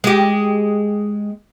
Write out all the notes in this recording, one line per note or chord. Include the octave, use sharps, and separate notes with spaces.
G#3 G4